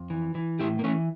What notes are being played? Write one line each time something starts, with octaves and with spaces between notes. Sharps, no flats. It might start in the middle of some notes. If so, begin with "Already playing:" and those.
Already playing: F2
E3
E3
A2 E4 G4
A#3
E3 A3 C#4